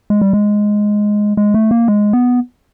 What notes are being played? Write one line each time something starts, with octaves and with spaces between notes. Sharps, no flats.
G#3
G3
G#3
G#3
A3
A#3
G#3
B3